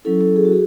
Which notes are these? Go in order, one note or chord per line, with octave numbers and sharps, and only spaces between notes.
F#3 C#4 E4 A4
A4
G#4
F#4
G#4